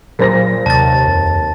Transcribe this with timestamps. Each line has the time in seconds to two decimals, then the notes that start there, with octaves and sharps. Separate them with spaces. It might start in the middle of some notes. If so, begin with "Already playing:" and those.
0.19 A#2 F#3 A#4 C5 A#6
0.66 D#2 C3 A5 A6
1.08 F2